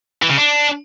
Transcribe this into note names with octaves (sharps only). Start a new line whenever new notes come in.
E3
C#3
D4